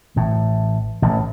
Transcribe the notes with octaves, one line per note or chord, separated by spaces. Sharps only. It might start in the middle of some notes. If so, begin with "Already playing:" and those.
A1 A2
A1 A2